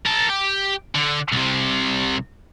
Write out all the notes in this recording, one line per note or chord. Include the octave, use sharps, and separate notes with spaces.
A#4 A5
G4
D3
C2 C3